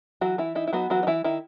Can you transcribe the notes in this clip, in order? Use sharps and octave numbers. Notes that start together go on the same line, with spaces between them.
E3 F#3 F#4
E3 E4
D#4 E4
E4
F#3 B3 F#4
E3 F#3 F#4
D#4
E3 E4
D#3 E4